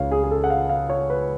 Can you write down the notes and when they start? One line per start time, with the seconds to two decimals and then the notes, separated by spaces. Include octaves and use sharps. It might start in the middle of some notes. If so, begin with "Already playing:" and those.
Already playing: C#2 C#3 G#3 C#5 F5
0.12 G#4
0.24 G#4
0.31 A4
0.44 F#5
0.50 F5
0.69 F5
0.90 C#5
1.10 B4